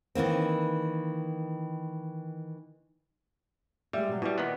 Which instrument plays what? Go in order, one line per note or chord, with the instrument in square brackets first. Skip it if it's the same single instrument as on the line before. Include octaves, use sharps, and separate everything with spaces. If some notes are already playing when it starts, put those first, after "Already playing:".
[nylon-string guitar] D#3 E3 A#3 C4
[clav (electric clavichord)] G3 [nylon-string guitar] G#3 E5
[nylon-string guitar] B2 F#3
[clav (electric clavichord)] B2 G3 [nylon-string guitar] E4
[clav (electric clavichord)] A#2 D#3 B3